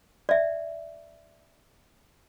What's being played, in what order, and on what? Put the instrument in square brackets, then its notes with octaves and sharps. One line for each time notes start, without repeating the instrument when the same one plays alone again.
[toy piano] D5 E5